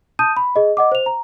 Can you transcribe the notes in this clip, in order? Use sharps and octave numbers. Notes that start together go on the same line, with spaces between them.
A5 D#6 G6 D#7
B5
G#4 D#5
D#5 F#5 D6
C5 F7
A#5